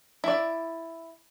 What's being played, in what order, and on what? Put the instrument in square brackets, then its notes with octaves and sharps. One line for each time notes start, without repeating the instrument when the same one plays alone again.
[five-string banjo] E4 D5